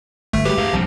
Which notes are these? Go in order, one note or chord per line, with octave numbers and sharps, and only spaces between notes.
G1 A3
F#3 G3 A3 G4 G#4 B4
E2 G2 G#4 A#4 F5
B1 F#2 F3 G3 C4 D#4